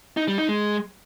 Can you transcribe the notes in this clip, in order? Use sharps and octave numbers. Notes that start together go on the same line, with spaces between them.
D#4
G3
D#4
G#3